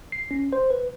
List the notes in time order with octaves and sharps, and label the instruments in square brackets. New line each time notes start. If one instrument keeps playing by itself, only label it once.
[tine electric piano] C7
C#4
C5
B4